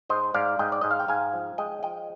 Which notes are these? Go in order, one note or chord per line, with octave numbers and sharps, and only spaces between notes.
G#2 C5 D#5
G#2 D5 F5
G#2 D#5 G5
D5
G#2 D#5
F5
G5
G#2 F5 G#5
F3
G#3 D#5 G5
F3 D#5 G5